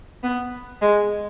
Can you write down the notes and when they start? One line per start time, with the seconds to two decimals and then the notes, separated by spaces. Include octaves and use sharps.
0.23 B3
0.82 G#3